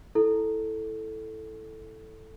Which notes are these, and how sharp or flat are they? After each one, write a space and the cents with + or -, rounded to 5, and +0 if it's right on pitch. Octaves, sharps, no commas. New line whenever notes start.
E4 +0 A4 +0